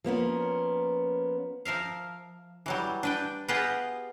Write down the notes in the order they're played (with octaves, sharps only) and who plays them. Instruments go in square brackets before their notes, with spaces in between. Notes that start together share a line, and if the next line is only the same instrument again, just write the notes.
[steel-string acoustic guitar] F3 A#3 B3 C#4
[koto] F3 A#4 E5 F5
E3 F#3 G3
D4 B4 G5
B3 F4 G4 G#4 B4 D#5